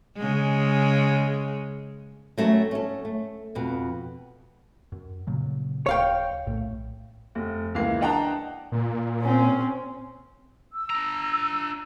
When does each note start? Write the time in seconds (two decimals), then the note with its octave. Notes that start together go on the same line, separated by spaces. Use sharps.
0.17 C#3 G#3
2.38 F#3 G3 A3 C#4 F#4 E5
2.71 C#4 A4
3.05 A3
3.55 F2 B2
4.92 F#2
5.27 A#2 C#3 F#3
5.86 D1 C#5 F5 G5
6.46 A#1 A2 A3
7.35 F1
7.75 C#2 E3 A#3 E5 C7
8.01 D4 D#5 F#5 G5 A5 A#5
8.72 A#2
9.21 C4 C#4
10.72 E6
10.90 D4 A#5